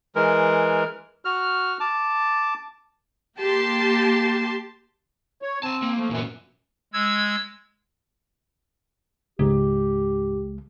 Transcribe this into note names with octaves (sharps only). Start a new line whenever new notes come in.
E3 G#3 A#4
F#4 F6
A5 D6
A#3 G4 A5 C6
C#5
C4 G#5 A5
A#3
F3 A3
F#2 A#2 E3 B3
G#3 E6 G#6
C#2 G#2 G#3 G4